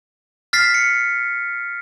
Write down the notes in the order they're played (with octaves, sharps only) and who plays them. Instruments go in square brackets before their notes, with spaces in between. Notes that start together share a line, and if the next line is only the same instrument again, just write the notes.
[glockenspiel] F6 A6 B6 C7
C#7